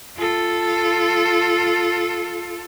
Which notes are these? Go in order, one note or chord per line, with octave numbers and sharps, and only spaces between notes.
F4 A4